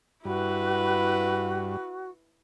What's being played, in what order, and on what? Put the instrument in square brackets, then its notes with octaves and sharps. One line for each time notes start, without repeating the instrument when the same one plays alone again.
[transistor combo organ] G2 [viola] E4 B4 [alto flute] F#4